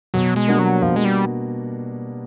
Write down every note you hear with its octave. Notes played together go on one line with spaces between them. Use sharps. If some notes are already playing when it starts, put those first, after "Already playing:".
B2 F#3
G#3
G3 A#3 D4 F#4
F#3
B2 F3
G#3
G3